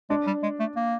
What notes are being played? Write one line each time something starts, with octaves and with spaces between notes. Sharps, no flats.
G#3 D4
G3
G#3
A3
A#3